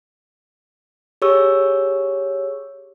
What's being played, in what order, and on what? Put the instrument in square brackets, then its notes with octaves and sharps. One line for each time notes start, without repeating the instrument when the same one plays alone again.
[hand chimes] G4 G#4 C#5 C#6 E6